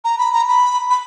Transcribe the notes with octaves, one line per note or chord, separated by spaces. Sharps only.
A#5
B5
A#5
B5
B5